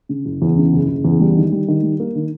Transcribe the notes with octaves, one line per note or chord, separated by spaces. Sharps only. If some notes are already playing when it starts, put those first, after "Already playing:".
C#3
F#1
E2
C#3
F#1
F#1
E2
G3
D#3
G3
D#3
G3
A#3
D#3